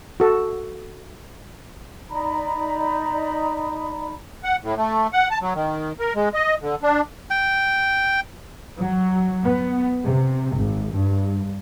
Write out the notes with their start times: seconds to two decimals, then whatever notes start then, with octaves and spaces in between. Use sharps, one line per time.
0.20 F#4 A4
2.10 D#4 D5 A#5 B5
4.44 F#5
4.63 A2
4.77 A3
5.13 F#5
5.30 A5
5.42 F#3
5.55 D#3
5.99 A#4
6.15 G#3
6.34 D#5
6.62 D3
6.83 D4
7.30 G5
8.78 F#3
9.45 B3
10.06 C3
10.56 G#1
10.93 G2